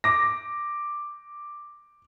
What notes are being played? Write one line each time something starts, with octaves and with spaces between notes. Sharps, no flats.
D6 A#6